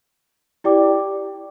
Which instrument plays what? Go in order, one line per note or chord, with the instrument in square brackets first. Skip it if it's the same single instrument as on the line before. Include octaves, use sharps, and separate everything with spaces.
[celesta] E4 G4 D5 G5 D6